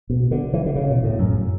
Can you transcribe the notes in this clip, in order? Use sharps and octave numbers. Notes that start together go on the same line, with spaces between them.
B2
D3
E3
D3
C#3
B2
A2
F#2